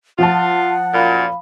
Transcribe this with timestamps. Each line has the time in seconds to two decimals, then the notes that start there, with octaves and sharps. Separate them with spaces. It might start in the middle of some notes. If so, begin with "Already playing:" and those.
0.19 F3 F4 F#5 A5
0.94 F#2 A#2 F5 B5